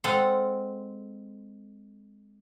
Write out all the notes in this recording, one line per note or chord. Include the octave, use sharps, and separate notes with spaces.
G#3 C4 A4 F5 F#5